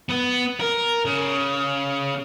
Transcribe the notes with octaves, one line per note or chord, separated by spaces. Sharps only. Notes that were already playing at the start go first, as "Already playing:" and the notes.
B3
A#4
C#3